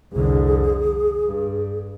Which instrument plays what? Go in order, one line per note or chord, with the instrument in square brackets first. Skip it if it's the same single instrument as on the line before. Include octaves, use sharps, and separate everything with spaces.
[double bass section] C2 F2 D3 [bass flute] G#4
[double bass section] G2